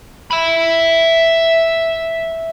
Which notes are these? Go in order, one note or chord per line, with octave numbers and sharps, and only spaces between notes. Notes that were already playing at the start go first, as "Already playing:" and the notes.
E5 B5